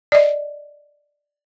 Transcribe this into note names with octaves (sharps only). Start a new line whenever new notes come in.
D5 D#5